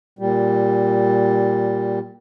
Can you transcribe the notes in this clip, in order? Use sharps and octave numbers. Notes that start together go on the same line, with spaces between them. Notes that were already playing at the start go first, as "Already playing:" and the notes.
A#2 G3